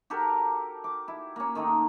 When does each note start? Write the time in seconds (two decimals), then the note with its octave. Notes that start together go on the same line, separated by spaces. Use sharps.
0.10 F#4 G4 A4 A#4
0.84 D6
1.08 E4
1.36 A#3 C#4
1.55 D#3 A3 A#3 D#4